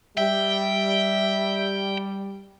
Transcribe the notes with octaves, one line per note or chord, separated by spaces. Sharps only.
G3 E5 G5